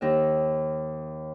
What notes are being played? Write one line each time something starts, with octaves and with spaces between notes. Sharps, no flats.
D#2 D#4 E5